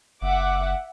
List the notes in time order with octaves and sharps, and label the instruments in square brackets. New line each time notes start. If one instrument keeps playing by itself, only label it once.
[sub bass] F#1 [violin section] E5 F#5 D6